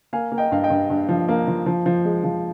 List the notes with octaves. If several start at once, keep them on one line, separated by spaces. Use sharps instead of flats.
A#3 F5 G#5
A#3
D#5 G5
G2 F5
D#5 G5
G2
G2
F3
A#3
F3
F3
F3
G#3
F3